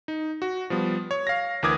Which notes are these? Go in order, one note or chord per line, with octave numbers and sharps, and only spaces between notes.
D#4
F#4
F3 G3 B3
C#5
F5 A#6
D2 E3 A#4 D6 D#6 G#6